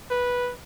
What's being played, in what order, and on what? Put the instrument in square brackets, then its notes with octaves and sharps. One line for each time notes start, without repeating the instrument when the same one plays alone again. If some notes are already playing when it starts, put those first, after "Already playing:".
[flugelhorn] B4